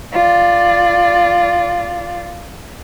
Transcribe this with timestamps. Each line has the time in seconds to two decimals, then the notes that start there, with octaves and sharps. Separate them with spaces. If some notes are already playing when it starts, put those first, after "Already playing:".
0.12 F4 D5